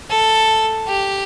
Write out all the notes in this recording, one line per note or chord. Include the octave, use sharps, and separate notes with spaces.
A4
G4